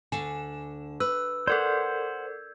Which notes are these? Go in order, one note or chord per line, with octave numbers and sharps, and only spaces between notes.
D2 G2 D3 G#5 E7
B4 E6 F#6
A4 A#4 C5 D5 F#5 G6 G#6